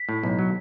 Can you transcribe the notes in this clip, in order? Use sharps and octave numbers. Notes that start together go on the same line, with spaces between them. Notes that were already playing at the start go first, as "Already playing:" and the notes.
Already playing: B6
A2
B1
F#3